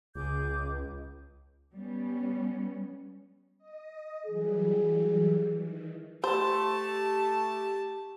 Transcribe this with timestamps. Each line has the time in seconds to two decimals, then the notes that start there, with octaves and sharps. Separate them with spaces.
0.15 C#2 G#4 D6 G6
1.73 G3 B3 C#4
3.58 D#5
4.26 E3 F#3 G3 G#4
5.52 D#3 E3
6.24 A3 G4 C5 A5